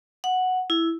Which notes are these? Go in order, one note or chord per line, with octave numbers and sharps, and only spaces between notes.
F#5
E4